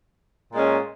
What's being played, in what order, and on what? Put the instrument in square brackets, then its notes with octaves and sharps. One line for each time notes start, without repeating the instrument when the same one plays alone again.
[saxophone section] A#2 G#3 C#4